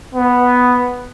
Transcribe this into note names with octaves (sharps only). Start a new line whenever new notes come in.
B3